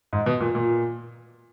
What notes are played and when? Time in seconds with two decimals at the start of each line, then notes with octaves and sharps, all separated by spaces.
0.13 G#2
0.26 B2
0.40 A#2
0.55 A#2